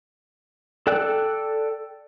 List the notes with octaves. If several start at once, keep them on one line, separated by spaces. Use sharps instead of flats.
A4 D5 G5 F#6